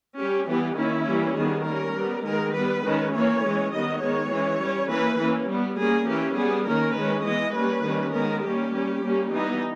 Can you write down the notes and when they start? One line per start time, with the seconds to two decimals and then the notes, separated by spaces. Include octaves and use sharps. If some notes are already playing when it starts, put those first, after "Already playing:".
0.18 G3 C#4 G4
0.48 E3 G3 B3 G4
0.77 D#3 A#3 C#4 E4
1.07 E3 G3 A#3 C#4
1.36 D#3 G3 B3 G#4
1.66 G3 A#3 C#4 A#4
1.95 G3 B3
2.24 D#3 G#3 B3 A#4
2.54 G3 B3 B4
2.83 D#3 G#3 C#4
3.13 E3 A#3 C#4 C#5
3.42 E3 G#3 C#4
3.72 D#3 G3 B3 D#5
4.01 D#3 G#3 B3 C#5
4.31 E3 G#3 C#4
4.60 G3 C#4
4.90 E3 A#3 C#4 B4
5.19 E3 A#3 C#4
5.49 G3 B3
5.78 G3 A#3 C#4 G#4
6.07 E3 A#3 C#4 G4
6.37 G3 B3 G#4
6.67 D#3 A#3 C#4 A#4
6.96 D#3 G#3 C#4 B4
7.25 E3 G#3 B3 D#5
7.55 G3 A#3 C#4 B4
7.84 D#3 G3 A#3 C#4
8.14 D#3 G#3 B3 A#4
8.43 G3 A#3 C#4 G4
8.73 G3 A#3 C#4
9.03 G3 A#3 C#4
9.32 E3 G3 B3 D#4